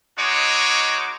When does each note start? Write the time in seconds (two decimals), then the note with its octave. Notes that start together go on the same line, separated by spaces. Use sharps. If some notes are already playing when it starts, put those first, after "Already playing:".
0.19 G#3 D#4 F#4 C#5 D6